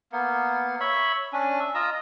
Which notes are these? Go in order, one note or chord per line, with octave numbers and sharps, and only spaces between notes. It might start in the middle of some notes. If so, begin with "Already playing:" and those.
A#3 B3
C#5 E5 B5
C#4 D4
E5
F4 D#5 A#5 E6